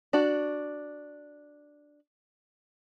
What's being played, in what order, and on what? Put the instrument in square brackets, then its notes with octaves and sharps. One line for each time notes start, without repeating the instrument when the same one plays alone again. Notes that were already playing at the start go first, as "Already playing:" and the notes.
[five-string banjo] D4 F#4